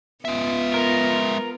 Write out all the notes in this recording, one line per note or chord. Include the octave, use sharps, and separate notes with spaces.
G#3 B3 F4 E5
A#4